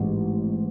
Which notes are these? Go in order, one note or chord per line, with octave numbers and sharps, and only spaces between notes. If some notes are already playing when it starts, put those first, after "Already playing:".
Already playing: A1 G#2